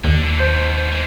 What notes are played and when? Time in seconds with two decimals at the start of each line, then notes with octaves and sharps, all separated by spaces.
0.04 D#2 D3
0.24 D3 E3
0.39 G#2 B2 C5 G6
0.92 E3 G#3